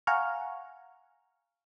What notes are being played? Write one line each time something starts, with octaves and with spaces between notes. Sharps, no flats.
F5 F#5 G#5 A#5 C#6 F6